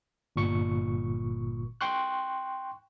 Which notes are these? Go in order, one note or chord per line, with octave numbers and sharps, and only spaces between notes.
G1 A#2 C#6 C#7
G5 C6 C#6 F#6